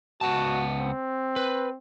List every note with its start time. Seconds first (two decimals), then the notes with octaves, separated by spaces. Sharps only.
0.21 C#2 B3 F#4 A5
0.80 C4
1.36 B4